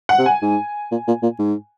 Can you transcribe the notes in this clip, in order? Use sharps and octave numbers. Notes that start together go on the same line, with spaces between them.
F#5
C3
G#5
G#2
A#2
A#2
A#2
G#2